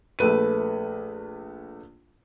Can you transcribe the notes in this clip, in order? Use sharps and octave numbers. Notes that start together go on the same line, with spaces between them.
A#1 A3 B4 D#7